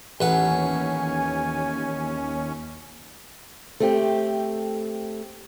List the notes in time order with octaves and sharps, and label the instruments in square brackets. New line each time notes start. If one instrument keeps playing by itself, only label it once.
[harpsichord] A1 B4 F#5 [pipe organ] D#2 C#4 [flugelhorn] G#5
[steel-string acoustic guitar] A3 C4 G4